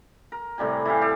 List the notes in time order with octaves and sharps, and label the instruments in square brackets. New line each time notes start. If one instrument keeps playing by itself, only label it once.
[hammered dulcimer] A#4
A2 C3 G3 G#5
E3 E4 G4 F5
G4 A4